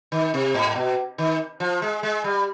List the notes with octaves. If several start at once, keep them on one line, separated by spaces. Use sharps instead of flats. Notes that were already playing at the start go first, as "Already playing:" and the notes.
D#3
C3
G#2
B2
D#3
F3
G#3
G#3
G3